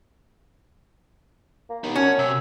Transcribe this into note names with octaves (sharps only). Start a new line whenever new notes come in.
A#3
D#2 B3 D#4
F#2 C#4 F#5 G#6
C3 E6